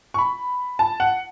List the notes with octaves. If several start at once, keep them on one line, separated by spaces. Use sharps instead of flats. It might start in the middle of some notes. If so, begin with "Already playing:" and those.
C#6
B5
A5
F#5